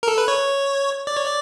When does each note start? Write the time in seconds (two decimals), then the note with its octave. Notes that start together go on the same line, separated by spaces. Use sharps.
0.03 A#4
0.08 A4
0.18 B4
0.28 C#5
1.07 D5
1.16 C#5
1.26 D5